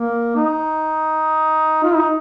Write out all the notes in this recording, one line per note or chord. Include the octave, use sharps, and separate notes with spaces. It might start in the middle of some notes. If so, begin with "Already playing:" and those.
Already playing: A#3
D#4
F4
D#4